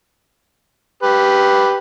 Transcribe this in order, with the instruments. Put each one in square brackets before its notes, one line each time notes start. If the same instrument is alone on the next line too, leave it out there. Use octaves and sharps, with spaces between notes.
[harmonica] G4 B4